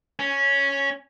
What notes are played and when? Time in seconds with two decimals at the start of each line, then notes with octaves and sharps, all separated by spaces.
0.19 C#4